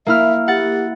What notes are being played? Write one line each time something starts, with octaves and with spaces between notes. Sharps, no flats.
A#3 E4 E5 F6
G4 F#5 A6